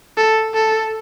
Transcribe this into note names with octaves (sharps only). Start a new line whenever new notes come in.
A4
A4